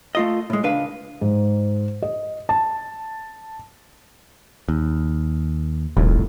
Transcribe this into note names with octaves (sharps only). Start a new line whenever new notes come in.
A3 F4 D#5
A2 G#3
C#2 D4 B4 F5
G#2
D#5
A5
D#2
D#1 C2 F2 A2